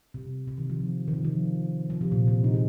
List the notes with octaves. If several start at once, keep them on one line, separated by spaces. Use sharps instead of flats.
C3
C3
D#3
F3
C3
D#3
C3
F3
F3
C3
A#2
C3
D#4
G#4